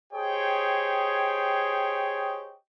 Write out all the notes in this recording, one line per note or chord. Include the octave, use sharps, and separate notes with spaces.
G4 G#4 C5 C#5 D#5 G5